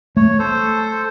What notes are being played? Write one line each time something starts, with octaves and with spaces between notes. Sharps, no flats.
A3 C#5
A4 C5